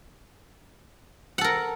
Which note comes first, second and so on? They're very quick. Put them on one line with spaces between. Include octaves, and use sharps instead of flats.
F#5 A4 A#4